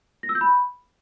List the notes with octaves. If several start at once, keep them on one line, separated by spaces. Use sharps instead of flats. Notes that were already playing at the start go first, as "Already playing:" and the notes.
A#6
E6
G6
B5